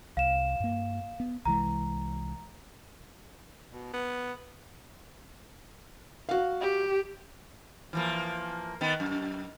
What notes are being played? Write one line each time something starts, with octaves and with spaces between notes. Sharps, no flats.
C2 F5 E7
G2 A#3
B3
C2 E3 G#3 A#5
B2
B3
F#4 F5
G4
E3 F3 A#3
D#3 B3
F#2